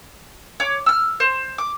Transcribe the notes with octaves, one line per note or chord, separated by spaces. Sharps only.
C#5 D6
E6 F6
C5
D6